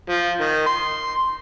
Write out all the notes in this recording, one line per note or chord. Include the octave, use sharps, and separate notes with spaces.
F3
D#3
C6